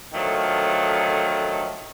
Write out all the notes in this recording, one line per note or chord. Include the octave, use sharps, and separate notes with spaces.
D3 D#3 F3 F#3 A3